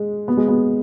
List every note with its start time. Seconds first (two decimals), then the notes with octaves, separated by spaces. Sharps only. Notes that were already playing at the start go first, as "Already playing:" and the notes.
Already playing: G#3
0.28 B3
0.37 G#3
0.48 B3